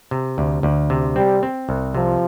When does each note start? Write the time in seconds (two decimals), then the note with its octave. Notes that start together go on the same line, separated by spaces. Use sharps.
0.11 C3
0.38 D2
0.63 D2
0.90 C3
1.16 G3 C4
1.43 C4
1.69 C2
1.95 C3 F3